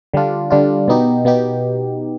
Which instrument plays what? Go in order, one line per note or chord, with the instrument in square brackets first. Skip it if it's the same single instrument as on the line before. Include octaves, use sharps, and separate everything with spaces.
[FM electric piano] D3 G3 D4 F4
D3 G3 D4 F4
B2 B3 D#4 G4
B2 B3 D#4 G4